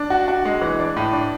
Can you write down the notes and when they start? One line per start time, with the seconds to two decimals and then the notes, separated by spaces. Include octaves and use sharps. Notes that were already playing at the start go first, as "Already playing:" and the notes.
Already playing: D4
0.10 F#4
0.28 F#4
0.45 G#3
0.62 E3
0.79 D4
0.96 A2
1.13 D4